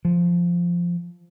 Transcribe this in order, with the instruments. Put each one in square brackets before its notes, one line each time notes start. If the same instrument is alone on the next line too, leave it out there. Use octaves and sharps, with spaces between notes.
[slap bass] F3